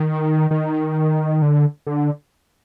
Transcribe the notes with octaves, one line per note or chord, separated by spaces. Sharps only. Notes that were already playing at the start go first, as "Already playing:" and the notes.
Already playing: D#3
D#3
D3
D3